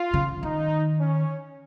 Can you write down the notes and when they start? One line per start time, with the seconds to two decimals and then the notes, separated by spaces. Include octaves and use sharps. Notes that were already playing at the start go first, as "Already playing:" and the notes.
Already playing: F4
0.14 C#3
0.43 D#3 D#4
1.00 C#4